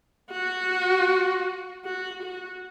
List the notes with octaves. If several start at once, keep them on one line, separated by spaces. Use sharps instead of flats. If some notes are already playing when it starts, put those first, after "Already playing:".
F#4
F#4
F#4